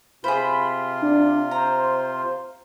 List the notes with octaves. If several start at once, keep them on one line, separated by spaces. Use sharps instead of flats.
C3 F4 G#4 C5 B5
D4
C5 A#5